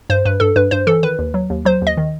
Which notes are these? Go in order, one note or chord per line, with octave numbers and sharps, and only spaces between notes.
G2 C5
G2 B4
G2 A4
G2 B4
G2 C5
E3 A4
D#3 B4
D#2
F#3
D#2
F#3 C5
D#2 D#5
D#3